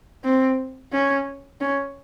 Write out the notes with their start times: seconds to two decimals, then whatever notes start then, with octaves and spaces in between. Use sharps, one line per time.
0.24 C4
0.93 C#4
1.61 C#4